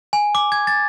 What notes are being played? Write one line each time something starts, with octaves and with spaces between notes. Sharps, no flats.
G#5
D6
G#6
A6